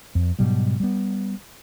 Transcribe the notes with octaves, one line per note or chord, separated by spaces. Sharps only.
F2
G#2 B2 F#3 G3
G3 B3